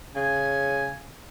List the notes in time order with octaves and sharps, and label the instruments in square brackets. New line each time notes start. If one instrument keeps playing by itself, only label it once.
[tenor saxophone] C#3 [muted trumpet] G#5